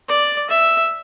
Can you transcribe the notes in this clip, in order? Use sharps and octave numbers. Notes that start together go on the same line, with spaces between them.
D5
E5